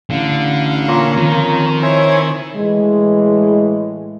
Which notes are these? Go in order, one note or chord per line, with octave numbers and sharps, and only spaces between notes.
A1 D3 F5
A#2 C#4 A#4
F2 D#3
C4 E4 C#5 G#5
A2 E3 G#3